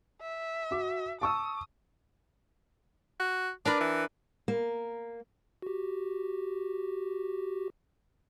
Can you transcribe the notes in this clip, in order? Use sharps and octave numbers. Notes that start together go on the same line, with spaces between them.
E5
F#4 D6
A5 C#6 D#6 E6
F#4
D4 A#4 B4 D5
E3
A#3
F#4 G4